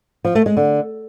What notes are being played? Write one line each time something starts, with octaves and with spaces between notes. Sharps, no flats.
F3
A3
G#3
D3